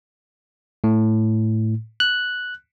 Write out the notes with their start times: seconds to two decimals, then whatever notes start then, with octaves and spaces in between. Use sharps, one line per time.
0.84 A2
2.00 F#6